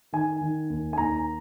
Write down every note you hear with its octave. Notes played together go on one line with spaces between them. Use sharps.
D#3 G#5
D#3
D#2
G#5
D#2 A#5